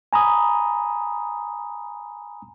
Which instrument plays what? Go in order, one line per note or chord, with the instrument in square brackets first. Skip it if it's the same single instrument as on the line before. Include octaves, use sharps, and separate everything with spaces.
[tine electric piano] G#5 A#5 B5 D#6